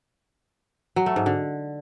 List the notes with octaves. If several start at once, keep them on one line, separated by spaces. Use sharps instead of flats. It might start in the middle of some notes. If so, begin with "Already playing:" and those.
F#3
A3
G#2
D3